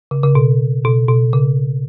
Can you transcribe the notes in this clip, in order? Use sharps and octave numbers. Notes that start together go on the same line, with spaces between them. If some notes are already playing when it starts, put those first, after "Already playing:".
C#3
C#3
B2
B2
B2
C#3